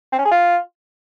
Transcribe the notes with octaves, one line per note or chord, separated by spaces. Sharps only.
C4
C#4
G#4
F4